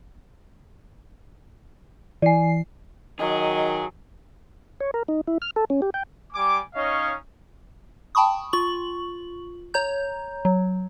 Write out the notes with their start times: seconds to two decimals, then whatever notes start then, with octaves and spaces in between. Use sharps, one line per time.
2.22 E3 D5 G#5 C7
3.20 D#3 F#3 G#4 D#5
4.80 C#5
4.94 A#4
5.08 D#4
5.27 E4
5.42 F6
5.56 A4
5.70 C#4
5.82 G4
5.94 G5
6.33 G3 G#5 D6
6.74 C#4 D#4 C#5 D#5 F5
8.15 G5 A5 B5 C#6 D#6
8.53 F4 C#6 F#7
9.74 C#5 A#5 G6
10.45 F#3